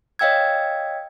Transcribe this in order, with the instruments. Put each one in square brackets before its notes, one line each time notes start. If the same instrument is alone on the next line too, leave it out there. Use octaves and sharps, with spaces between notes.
[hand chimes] C#5 D#5 F5 G5 E6 G#6